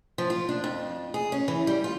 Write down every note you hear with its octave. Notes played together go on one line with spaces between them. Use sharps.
F3
F4
D4
F2
G#4
C#4
E3
G3
F4